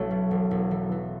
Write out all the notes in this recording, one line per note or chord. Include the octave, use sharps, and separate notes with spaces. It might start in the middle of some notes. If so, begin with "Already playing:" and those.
Already playing: B1 F#3 A3 B3 C#4 E4
B2
E1
E1
E3
E3